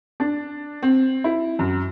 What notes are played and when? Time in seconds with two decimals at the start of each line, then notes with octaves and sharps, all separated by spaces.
0.20 D4
0.83 C4
1.24 E4
1.59 F#2